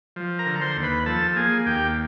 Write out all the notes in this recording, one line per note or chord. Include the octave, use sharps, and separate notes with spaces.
F3
A#4 A#5
D3
C5 C6
D#2
B4 B5
F3 A4 A5
A#3 G#4 G#5
D#2 G4 G5